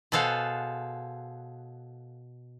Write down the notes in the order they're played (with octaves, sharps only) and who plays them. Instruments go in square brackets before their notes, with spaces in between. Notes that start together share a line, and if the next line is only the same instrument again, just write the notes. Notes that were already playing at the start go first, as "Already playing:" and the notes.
[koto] B2 G#4 A4 C5 F5 F#5